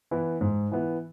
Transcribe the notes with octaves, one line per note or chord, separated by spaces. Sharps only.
E3 B3 E4
G#2
E3 B3 E4